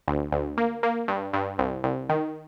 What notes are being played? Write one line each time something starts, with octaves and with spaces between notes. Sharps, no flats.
D2
D2
A#3
A#3
G2
G2
C2
C2
D#3